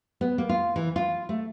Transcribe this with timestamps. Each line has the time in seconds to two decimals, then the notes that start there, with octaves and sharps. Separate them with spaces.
0.21 B3
0.38 A#3
0.49 F4
0.76 E3
0.96 F4
1.29 A3